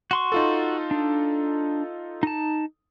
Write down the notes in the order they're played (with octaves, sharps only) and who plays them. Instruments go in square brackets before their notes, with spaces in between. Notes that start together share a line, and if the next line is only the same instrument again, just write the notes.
[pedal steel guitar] F#4 C6 C#6
[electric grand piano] D#4 F4 A4
[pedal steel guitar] D4
D#4 A5